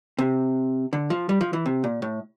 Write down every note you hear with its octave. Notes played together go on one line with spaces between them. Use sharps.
C3
D3
F3
G3
F3
E3
C3
A#2
A2